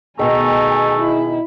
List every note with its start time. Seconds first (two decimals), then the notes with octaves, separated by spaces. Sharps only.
0.19 B2 D#3 A3 G#4 G#5 A#5
0.97 E4